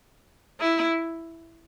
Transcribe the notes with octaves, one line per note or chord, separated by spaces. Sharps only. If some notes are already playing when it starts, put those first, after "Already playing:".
E4